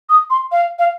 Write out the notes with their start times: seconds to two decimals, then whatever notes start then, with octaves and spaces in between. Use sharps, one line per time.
0.09 D#6
0.30 C6
0.52 F5
0.79 F5